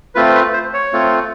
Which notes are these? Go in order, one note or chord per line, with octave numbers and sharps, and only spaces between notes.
A3 C4 F4 B4
B4
C5
C#5
A3 C4 F4